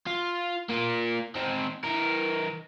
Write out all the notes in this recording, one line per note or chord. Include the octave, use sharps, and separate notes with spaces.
F4
A#3 F4
C4 D#4
E3 A#4